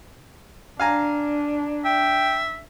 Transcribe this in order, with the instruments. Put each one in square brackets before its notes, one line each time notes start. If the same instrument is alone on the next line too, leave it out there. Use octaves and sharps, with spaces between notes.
[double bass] D4 [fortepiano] F5 G#5 A#5
[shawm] E5 [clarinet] G5